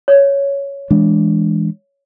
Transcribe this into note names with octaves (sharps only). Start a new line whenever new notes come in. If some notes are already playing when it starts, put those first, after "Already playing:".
C#5
E3 G#3 D4